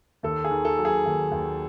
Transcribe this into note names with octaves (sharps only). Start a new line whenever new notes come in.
D#2 A4
G#4
D#3
A4
F#3
G#4
D#2
D#2